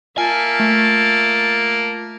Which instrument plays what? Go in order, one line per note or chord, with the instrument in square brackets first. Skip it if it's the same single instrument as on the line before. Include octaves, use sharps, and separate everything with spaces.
[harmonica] A#3 [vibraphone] F4 [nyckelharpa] E5 A5 [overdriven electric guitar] G#5
[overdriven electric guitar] A3